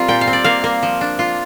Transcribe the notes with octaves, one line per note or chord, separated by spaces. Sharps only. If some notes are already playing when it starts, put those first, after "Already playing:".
Already playing: G3 C4 F4 A#4
A#2 G5
F5
C4
D5
A#3 F5
A#3
F3
D4
F4